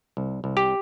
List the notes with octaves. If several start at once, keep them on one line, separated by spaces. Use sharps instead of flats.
C2
C2
G4